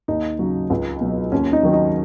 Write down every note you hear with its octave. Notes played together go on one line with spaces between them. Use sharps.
D#2 D#4
C#3 F#3
C#2
B2 F#3
D#2 C#4
D#4
D#3 F#3
D#4